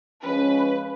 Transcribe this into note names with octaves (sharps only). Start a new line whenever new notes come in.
F3 G#3 C#4 B4